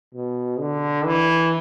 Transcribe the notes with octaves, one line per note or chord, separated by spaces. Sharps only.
B2
D3
E3